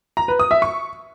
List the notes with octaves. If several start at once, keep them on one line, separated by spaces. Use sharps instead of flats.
A#5
B4
D#6
E5
C#6